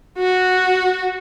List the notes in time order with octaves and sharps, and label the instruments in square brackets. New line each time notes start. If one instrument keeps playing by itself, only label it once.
[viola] F#4